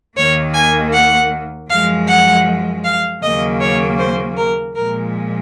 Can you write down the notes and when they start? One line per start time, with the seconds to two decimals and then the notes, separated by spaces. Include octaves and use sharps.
0.16 D#2 D#3 A#3 C#5
0.54 G#5
0.93 F#5
1.69 F#2 F3 G#3 F5
2.07 F#5
2.84 F5
3.22 D#2 C#3 F#3 A#3 D#5
3.60 C#5
3.99 C5
4.37 A#4
4.75 A#2 F3 G#3 A#4